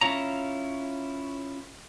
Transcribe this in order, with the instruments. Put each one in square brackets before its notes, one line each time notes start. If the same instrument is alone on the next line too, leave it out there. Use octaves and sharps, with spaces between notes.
[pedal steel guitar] C#4 E4 F4 C#5 A#5